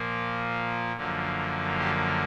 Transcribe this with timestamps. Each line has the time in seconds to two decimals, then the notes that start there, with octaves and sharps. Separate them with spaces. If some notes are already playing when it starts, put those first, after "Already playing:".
Already playing: A#2 F3 A#3
0.96 F#2 D3 F3 A#3
1.79 G4